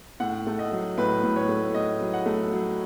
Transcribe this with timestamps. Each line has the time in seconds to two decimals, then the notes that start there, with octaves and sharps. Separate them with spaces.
0.20 A2 F#5
0.47 A3
0.59 D#5
0.72 F#3
0.97 A2 B4
1.23 A2
1.36 C#5
1.49 A3
1.74 A2 D#5
2.01 F#3
2.13 F#5
2.26 A3
2.52 F#3